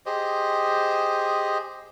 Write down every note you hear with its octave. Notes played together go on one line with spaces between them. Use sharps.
G4 G#4 C5 D#5